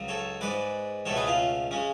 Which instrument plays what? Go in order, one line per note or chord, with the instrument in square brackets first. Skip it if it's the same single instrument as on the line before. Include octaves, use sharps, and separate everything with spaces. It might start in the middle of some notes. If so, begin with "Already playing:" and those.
Already playing: [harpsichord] C#2 C#3 F#3
A4 C#5
G#2 G#3 B4 D5
C#2 B2 A3 A4 C#5
G#4 B4
C#4 F4
C#3 G#3 C#4